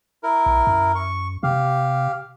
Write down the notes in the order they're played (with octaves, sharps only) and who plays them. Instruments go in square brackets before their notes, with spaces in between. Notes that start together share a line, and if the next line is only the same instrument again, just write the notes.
[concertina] E4 A#4
[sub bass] B1
F#2
[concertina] C#6
[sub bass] C3 [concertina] G4 F5